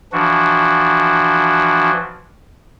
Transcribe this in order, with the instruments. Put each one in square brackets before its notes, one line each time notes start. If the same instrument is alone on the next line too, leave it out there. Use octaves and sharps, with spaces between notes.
[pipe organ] E3 F3 D4 F#4